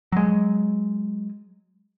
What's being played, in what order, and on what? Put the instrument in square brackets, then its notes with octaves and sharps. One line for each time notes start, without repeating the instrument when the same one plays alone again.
[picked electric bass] F#3 G#3